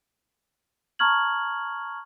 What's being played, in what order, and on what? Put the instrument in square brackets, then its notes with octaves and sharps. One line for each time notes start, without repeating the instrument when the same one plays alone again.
[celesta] A5 A#5 C#6 F6 G#6 F#7